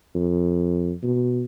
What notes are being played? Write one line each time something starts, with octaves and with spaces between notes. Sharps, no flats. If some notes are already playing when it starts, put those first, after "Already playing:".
F2
B2